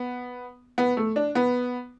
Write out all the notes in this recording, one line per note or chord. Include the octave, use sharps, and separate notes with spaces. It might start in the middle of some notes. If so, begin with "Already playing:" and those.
Already playing: B3
B3
A3
D4
B3